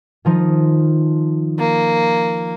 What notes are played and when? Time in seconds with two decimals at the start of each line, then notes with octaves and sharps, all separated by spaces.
0.25 D#3 F3 D#4
1.59 A#3